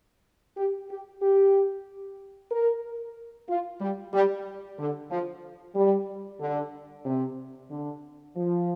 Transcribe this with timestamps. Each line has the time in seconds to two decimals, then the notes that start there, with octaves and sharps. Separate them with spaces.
0.57 G4
0.90 G4
1.22 G4
2.51 A#4
3.49 F4
3.81 G3
4.14 G3
4.79 D3
5.11 F3
5.76 G3
6.41 D3
7.05 C3
7.71 D3
8.36 F3